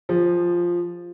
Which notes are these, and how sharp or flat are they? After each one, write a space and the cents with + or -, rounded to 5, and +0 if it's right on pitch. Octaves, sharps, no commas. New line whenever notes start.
F3 +0 G#4 -45